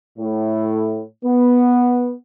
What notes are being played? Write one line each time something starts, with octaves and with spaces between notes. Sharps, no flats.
A2
B3